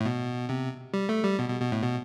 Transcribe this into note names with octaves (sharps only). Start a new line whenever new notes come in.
A2
B2
C3
G3
A3
G3
B2
B2
B2
A2
B2